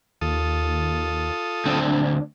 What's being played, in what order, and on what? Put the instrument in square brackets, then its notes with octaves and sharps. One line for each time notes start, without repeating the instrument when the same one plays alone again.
[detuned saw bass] D#2 [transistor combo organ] F4 A4 D#6
[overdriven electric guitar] D2 C4 [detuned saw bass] D4